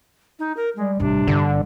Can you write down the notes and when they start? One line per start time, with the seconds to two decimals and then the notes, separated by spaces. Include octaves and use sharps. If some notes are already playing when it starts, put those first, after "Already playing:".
0.39 D#4
0.57 A#4
0.76 G3 G#3
1.00 A1 G2 C3 D4
1.27 G1 G2 D3